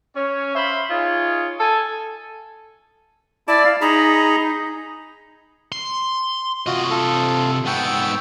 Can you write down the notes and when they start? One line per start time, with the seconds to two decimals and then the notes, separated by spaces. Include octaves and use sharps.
0.14 C#4 C#5
0.54 C5 E5 F5 B5
0.88 D#4 F4 G#4 C#5
1.58 A4 G#5
3.48 E4 D5 A5 D6
3.65 F5
3.81 D#4 G#4 A#5 B5
5.72 C6
6.66 C3 F4 F#4 D#5
6.90 F4 A4
7.67 G#2 B3 G5 C#6 E6